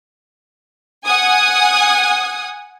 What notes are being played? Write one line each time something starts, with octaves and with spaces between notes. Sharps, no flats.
F#5 G#5 D#6